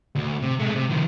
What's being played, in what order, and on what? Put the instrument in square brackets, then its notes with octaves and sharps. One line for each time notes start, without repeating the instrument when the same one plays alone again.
[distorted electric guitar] D2
C3
G#3 A3
C3
D#3 F3